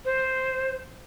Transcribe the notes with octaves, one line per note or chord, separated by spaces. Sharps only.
C5